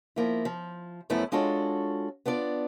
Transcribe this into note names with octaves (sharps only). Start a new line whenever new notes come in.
F3 A#3 E4
F3
F#2 F3 A3 B3 C#4 E4
G#3 D4 F4 F#4 A4 C#5
B3 D4 F4 D5